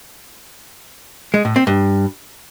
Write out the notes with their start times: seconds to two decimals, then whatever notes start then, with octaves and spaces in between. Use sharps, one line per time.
1.34 G#3
1.45 A2
1.56 C4
1.67 G2